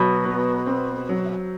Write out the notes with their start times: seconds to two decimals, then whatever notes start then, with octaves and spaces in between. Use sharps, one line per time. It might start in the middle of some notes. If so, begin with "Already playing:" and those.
Already playing: B2 F#3
0.25 B3
0.66 C4
1.09 F#3